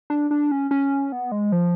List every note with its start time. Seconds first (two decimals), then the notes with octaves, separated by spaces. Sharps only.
0.10 D4
0.31 D4
0.52 C#4
0.71 C#4
1.12 B3
1.32 G#3
1.52 F3